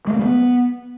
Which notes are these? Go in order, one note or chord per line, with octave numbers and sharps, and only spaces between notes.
G#3
A#3
G3
B3